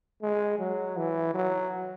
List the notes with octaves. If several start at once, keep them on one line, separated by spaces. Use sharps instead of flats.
G#3
F#3
E3
F#3